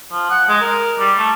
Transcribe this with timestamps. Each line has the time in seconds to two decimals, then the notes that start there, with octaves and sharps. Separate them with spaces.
0.12 F3
0.30 F#5
0.48 G#3
0.61 A#4
0.99 G3
1.18 A3